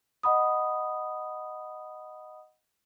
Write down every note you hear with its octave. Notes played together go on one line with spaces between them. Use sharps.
D#5 F#5 B5 D#6